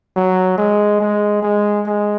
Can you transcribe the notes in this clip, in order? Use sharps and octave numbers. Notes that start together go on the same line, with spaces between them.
F#3
G#3
G#3
G#3
G#3